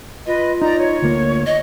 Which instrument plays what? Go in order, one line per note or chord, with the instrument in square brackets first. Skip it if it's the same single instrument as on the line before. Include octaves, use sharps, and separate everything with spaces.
[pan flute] F4 [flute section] B4 D#5
[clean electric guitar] D#4 [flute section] D5 A#5
[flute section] C#5
[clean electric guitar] D2 A#3
[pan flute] D#5